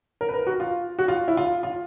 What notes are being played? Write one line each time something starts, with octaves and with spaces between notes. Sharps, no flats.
A#4
B4
A#4
F#4
F4
F#4
F4
E4
F4
F4